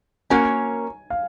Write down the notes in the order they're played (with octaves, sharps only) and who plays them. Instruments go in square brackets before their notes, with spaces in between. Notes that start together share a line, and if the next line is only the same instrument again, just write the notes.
[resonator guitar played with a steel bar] A#3 C#4 F#4 A#4 C#5 [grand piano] G#5
[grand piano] F5